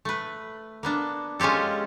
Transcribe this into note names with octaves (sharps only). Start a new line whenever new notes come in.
A3 B4
A#3 B3 D4
G#3 C#4 F4 G4 A4